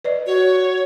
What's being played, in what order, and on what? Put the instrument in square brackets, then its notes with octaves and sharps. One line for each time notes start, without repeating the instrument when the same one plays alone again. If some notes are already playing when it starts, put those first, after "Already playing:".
[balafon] B4 D5 D#5
[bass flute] F#4 [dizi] C#5